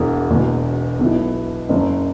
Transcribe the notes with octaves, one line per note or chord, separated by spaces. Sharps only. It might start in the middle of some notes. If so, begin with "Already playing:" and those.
Already playing: E1 E2 E3
E1 E2 B2
B1 B2 B3 E4
F#1 F#2 C#3 F#3